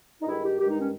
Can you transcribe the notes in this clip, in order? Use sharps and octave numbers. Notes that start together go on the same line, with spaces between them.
D#4
G2 D#3 G#3 E4
G4
G2 D#3 G#3 G4
D#4
C#4